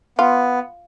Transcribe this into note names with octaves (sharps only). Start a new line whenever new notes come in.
B3 F4